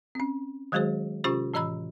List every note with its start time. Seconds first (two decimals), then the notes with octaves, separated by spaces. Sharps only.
0.15 C4 C#4
0.72 D#3 F#3 G#3 F#4 G#4 C5
1.24 C3 C#4 F4 G4 C5 C#6
1.54 A2 E3 D#5 A#5 B5 E6